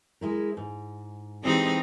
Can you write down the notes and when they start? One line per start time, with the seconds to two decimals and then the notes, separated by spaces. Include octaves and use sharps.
0.21 G#3 E4 A#4
0.57 G#2
1.43 E3 G#3 C4 D#4 G4 A4